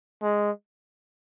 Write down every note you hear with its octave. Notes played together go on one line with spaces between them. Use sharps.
G#3